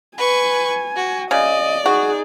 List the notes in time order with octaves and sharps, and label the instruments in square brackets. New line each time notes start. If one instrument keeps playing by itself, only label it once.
[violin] B4 C#6 [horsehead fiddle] G#5
[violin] F#4
[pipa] C#3 [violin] D5 [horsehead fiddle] D#5
[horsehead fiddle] D#4 G#4 [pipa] F#4